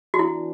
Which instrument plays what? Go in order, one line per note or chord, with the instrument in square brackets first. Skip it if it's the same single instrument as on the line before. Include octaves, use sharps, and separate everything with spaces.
[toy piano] F#4
[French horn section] E3 B3 D4 [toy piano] E4